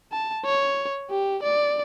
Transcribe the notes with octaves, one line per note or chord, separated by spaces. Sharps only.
A5
C#5
G4
D5